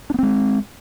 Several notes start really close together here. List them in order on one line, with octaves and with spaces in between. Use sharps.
D4 B3 C4 G#3